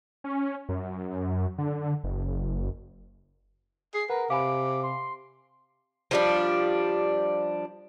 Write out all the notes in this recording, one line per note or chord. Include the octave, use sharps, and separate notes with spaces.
C#4
F#2
D3
F#1
G#4 C7
A#4 B4 F#5
C3 F5 G#5 B5 D6
C6
F3 G3 D4